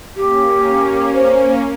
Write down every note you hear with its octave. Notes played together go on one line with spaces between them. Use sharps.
A#3 C#4 G4
C5